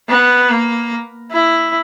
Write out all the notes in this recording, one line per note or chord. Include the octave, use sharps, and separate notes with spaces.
B3
A#3
E4